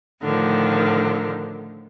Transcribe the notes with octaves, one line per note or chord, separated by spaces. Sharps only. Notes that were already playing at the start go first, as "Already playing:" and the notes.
A2 D3 D#3 F3